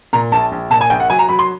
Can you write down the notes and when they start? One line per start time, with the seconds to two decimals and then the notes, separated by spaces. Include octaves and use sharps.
0.13 A#2 A#5
0.32 A#1 A5
0.52 A#1
0.70 A#2 A5
0.81 G#5
0.90 A#1 G5
1.00 F#5
1.10 F#3 G#5
1.19 A#5
1.29 F#3 B5
1.39 C6